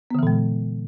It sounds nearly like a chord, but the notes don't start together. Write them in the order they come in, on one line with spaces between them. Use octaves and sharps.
B3 D3 E3 A#2 G#3